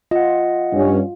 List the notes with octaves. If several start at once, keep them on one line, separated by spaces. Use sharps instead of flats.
F4 D#5 F#5
G2 C#4